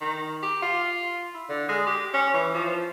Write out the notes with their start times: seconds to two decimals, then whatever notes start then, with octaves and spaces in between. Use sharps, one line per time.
0.01 D#3
0.43 G4
0.63 F4
1.34 E4
1.49 D3
1.69 G#3
1.87 G4
2.14 C#4
2.34 E3
2.55 F3